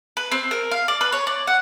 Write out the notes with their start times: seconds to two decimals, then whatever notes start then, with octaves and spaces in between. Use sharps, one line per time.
0.17 B4
0.32 C4
0.51 A#4
0.71 F5
0.88 D5
1.01 B4
1.12 C#5
1.27 D5
1.47 F#5